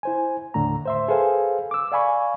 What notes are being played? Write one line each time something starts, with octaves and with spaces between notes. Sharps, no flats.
E4 C5 G#5
D#2 A2 D3 A3 A#5
C5 E5 C6
G#4 A4 B4 C5 F5 G#5
D6 E6
D5 F5 G#5 B5 C#6